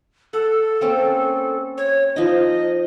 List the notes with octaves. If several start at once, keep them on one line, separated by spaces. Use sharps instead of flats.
A4 F#5
A#3 C4 C#4
C#5
F3 D#4 D#5